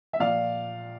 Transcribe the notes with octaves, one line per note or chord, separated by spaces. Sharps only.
E5
A#1 A#2 F3 D5 F5